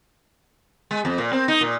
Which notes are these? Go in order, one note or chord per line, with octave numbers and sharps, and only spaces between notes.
G#3
F2
A#2
C4
D#4
A#2